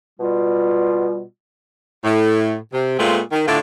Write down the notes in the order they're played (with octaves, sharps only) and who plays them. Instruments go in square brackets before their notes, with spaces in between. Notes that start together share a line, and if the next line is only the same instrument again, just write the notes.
[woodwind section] B2 G3 F4
[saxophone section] A2
C3
A#2 G#3 A3 B3 C4 F4
D#3
A2 D3 D4 E4 F4